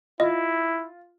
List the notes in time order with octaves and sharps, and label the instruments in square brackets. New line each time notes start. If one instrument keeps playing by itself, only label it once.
[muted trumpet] E4 [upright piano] F4 [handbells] D#5